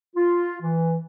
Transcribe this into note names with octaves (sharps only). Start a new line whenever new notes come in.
F4
E3